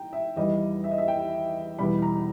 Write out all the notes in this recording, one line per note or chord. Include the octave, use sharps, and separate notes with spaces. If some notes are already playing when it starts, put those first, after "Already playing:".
Already playing: E3 G5 A#5
E5
E2 D#3 G3 D#5
E5
D#5
E5
G5
E2 B2 G3 B5
A#5